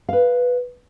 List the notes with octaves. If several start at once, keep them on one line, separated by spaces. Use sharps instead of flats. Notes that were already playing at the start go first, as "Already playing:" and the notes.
B4 F5